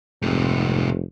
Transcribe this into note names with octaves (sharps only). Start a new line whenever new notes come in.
F1 G#2 C3